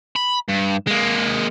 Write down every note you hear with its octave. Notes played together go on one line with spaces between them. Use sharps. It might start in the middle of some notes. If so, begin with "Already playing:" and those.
B5
G2
G#3 A#3